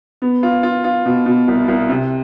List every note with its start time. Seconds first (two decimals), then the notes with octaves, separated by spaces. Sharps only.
0.22 B3
0.43 F4
0.63 F4
0.84 F4
1.06 B2
1.26 B2
1.48 C2
1.68 C2
1.89 C3